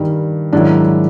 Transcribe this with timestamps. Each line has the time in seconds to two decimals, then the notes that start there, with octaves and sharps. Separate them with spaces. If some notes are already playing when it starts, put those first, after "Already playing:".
Already playing: G2 D#3 G3
0.53 G#2 D#3 F#3 D4 E4